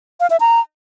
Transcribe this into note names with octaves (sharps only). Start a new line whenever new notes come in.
F5
E5
A#5